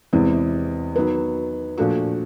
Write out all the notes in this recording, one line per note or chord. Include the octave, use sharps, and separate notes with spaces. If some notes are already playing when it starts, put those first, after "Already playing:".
E2 C3 E3 G#3 C4
D#3 F#3 B3
A#2 F3 A3 D4 F#4